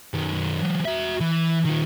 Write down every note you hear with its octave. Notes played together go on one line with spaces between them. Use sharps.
F#2 D#3
E3 F#3
F#4 E5
E3
D#3 F4